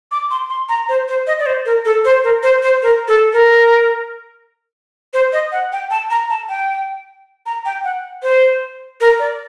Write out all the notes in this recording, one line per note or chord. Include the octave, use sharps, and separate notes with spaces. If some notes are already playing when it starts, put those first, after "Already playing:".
D6
C6
C6
A#5
C5
C5
D#5
D5
C5
A#4
A4
C5
A#4
C5
C5
A#4
A4
A#4
C5
D#5
F#5
G5
A5
A#5
A5
G5
A#5
G5
F#5
C5
A#4
D5